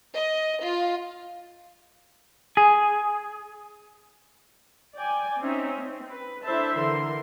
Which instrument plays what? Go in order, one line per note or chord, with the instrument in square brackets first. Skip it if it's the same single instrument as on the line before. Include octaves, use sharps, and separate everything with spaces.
[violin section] D#5
F4
[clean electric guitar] G#4
[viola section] D5 G5 G#5
C4 C#4 D#4 E5
C4
B4
D4 E4 A4 C5 E5 A5
D3 E3 A#4 C6